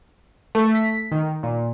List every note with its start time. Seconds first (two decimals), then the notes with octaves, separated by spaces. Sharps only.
0.55 A3
0.75 B6
1.12 D#3
1.43 A#2